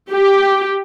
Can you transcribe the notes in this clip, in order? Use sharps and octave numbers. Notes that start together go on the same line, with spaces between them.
G4